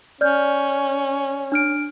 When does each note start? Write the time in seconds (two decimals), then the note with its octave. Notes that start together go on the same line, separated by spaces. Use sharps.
0.21 C#4 D5 F6 G6
1.52 D4 F6 D7